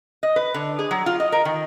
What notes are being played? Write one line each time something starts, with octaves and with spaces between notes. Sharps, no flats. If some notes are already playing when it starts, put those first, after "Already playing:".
D#5
B4
D3
G#4
F#3
F4
D#5
A#4
D#3